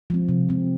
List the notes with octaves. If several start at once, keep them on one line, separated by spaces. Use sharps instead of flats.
F3 G#3 C4
C3
F3 G#3 C4